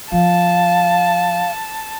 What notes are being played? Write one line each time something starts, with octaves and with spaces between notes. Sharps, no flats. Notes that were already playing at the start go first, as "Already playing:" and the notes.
F3 F5 A5